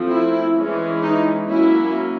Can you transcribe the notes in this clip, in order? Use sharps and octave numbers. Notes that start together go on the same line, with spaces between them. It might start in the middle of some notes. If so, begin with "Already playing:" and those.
Already playing: F3 A3 C4
E4
E3 G#3 C#4
D#4
F#3 A#3 C#4 E4